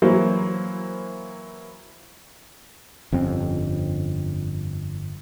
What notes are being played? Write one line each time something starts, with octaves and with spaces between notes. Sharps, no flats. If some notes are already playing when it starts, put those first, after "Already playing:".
E3 F#3 A#3 E4 C5
G1 F2 C4 C#4